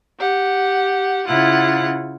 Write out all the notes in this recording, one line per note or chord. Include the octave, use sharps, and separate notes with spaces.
G4 F#5
C#3 E4 F4 F#5 F#6